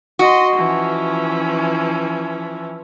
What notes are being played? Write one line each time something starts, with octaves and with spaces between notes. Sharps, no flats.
F#4 D#5 C6
E3 F3 C#4